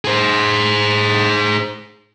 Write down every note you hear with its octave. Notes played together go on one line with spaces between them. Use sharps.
G#4 C5